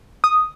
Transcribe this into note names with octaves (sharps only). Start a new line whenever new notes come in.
D#6